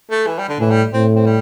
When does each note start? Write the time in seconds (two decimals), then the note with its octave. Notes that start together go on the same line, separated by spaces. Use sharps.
0.11 A3
0.27 E3
0.38 G3
0.49 D3
0.60 A2 E3
0.71 G3
0.93 A2 C4
1.15 C4
1.26 G3